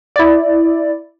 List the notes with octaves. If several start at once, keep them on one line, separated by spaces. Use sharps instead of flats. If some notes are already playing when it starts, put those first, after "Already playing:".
E4 D5